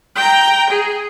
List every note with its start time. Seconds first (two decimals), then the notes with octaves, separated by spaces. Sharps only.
0.16 G5 A#5
0.70 G#4